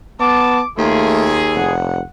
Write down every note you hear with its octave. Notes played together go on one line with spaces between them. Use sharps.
B3 A5 D6
D#2 A3 F4 G#4
F1 F#5